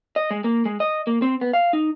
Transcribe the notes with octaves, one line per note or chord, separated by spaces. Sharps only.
D#5
G#3
A#3
G#3
D#5
A#3
C4
B3
F5
D#4